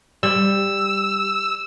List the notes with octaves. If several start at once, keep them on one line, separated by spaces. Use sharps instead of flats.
G3 E6